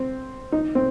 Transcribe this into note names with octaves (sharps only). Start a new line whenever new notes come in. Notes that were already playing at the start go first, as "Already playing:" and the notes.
Already playing: C4
D#4
C4